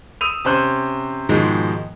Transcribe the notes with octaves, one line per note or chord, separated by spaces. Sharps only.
D#6 E6 D#7 F7
C3 C#4 C5 F#6
G#2 B2 D#3 F3 G#3